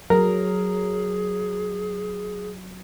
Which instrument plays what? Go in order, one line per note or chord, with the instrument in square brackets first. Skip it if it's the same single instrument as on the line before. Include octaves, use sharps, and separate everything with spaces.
[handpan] F#3 [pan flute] G#4 [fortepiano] A#4